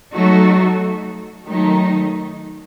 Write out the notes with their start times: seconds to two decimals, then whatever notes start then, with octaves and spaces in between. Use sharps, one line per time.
0.12 F#3 A3 D#4 F#4 A4
1.46 D#3 F#3 A3 D#4